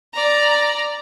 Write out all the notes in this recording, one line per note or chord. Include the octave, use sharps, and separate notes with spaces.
D5 A#5